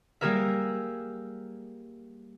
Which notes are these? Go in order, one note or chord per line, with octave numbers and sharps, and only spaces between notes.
G3 A#3 G4 G#4 A#4 E5